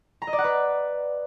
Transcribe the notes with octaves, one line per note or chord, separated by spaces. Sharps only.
A#5
D#5
D5
F#5
B4